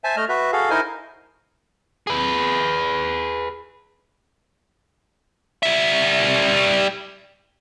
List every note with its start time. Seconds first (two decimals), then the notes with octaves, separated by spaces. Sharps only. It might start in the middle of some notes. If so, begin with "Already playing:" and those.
0.04 C5 E5 G#5 A5
0.17 A3 D#5 F6
0.29 F#4 B4 E5
0.52 F#4 G#4 A4 F5
0.70 D#4 E4 A#4 C5 D#5 G#5
2.07 G#4 B4
5.63 G3 E5